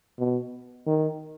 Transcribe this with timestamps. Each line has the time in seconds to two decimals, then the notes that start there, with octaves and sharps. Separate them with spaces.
0.19 B2
0.87 D#3